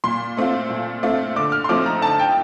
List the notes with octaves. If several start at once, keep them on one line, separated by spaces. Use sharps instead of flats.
A#2 C6
A3 C4 F4
A#2
A3 C4 F4
D3 D6
F6
C6
F3 A3 C4 D#4 D6
A#5
D3 A5
G5